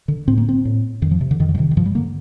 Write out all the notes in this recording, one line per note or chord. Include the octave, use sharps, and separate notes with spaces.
D3
A2 C4
A#3
C4
A2
F2 D#3
F3
C3
D3
F2 D#3
D3
F3
C3 D#3
D#3
G2 F3
G3
D3 A#3